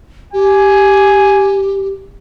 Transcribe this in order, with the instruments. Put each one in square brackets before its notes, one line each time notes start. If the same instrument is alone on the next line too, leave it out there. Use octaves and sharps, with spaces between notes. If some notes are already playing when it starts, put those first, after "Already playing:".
[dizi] G4 [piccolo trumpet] G#5